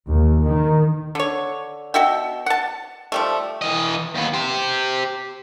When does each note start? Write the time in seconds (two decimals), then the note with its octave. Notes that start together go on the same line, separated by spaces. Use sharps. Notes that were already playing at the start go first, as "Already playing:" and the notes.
0.12 D#2
0.47 D#3
1.15 D3 C#5
1.94 B2 F#4 E5 G5
2.46 F#5 A5
3.12 F3 G3 A3
3.61 E3 D#5
4.14 D#2 B3
4.33 G4 C5